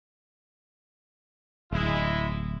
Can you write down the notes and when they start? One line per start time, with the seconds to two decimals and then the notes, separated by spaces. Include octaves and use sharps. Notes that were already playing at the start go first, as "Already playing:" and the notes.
1.72 D1 G#3 E4